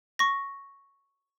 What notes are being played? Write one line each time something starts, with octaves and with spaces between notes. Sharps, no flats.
C#6 A#6